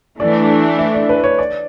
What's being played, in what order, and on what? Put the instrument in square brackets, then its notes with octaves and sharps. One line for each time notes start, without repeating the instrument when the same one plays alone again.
[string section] E3 A3 D4 [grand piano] D5
[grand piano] E5
D5
B4
C#5
D5